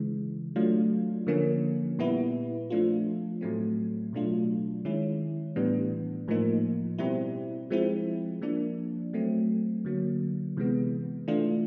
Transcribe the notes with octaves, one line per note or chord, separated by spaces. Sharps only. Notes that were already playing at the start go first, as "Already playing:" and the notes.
Already playing: C#3 E3 G#3
F#3 A3 D4 F4
D3 F3 A#3 C#4
A#2 G3 B3 E4
F3 A3 D4 F4
A2 F#3 A3 C4
B2 F#3 A3 D4 F4
D#3 G#3 C#4 E4
A2 E3 G3 B3 D4
A2 F3 A#3 D#4
B2 G3 C4 E4
F3 G#3 C4 E4
F3 A#3 D4
F#3 A3 C4
D3 F#3 A#3
C3 E3 G#3 B3
E3 A3 D4 F4